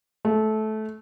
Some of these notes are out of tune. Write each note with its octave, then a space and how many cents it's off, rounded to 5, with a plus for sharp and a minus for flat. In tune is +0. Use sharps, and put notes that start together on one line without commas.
A3 -20